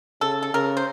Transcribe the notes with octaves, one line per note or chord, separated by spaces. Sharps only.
C#3 A4
A4
C#3 A#4
C5